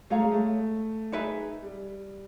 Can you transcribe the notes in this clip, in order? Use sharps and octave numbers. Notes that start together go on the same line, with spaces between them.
A3 G#4 C#5 F5 A#5
G#3
A3
D#4 G#4 B4 E5
G3